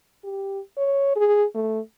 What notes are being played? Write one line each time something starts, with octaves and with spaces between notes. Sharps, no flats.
G4
C#5
G#4
A3